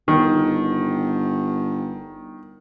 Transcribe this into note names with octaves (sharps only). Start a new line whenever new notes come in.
G1 D#3